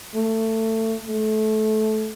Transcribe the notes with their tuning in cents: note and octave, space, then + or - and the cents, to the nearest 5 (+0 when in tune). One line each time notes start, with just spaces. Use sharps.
A3 +20
A3 -20